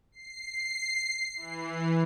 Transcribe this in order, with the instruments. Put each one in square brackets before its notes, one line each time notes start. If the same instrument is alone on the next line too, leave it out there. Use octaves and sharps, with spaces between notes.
[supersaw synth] C7
E3